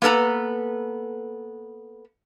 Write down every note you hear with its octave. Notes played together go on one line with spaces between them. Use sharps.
A#3 B3 A4 B4 A#5